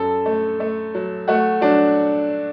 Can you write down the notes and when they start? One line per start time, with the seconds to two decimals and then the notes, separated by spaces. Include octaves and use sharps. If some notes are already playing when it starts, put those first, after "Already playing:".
Already playing: F#2 A4
0.26 A3
0.60 A3
0.95 F#3
1.28 A3 F#4
1.61 F#3 D4